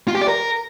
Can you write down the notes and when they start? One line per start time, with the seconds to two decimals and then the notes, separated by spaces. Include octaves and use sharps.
0.08 F4
0.15 G4
0.21 D5
0.28 A#4